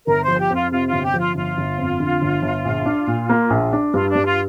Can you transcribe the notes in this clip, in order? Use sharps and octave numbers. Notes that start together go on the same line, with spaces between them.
G1 A#4
F3 C5
G4
F2 F4
C3 F4
F4
G1
G4
F3
F4
G1 F4
G1
F2
D3
G1
G1
A#1
D4
A#2
A#3
A#1
D4
G2 F4
D4
G2
F4